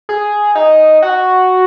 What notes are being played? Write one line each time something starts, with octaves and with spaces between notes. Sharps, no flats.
G#4
D#4
F#4